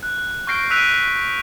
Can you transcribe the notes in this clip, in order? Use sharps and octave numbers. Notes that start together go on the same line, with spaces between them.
F#6
C#6 F6 G6 A#6 C7 D7
E6 F#6 B6 D7 D#7 F7